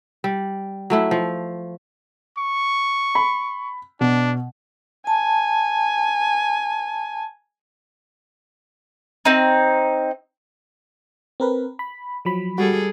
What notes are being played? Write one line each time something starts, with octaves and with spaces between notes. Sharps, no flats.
G3
F#3 A3 E4
F3
C#6
B5
B2 D4
G#5 A5
C4 D#4
C4 A#4 B4
B5
F3 F#3 B5
G3 F#4 G#4 A4